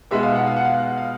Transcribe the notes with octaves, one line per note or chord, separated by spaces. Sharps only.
B2 G#3 B3 D#4 E5
F5
F#5
F5
F#5
F5
F5